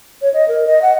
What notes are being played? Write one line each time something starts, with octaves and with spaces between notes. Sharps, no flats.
C#5
D#5
A#4
D#5
F#5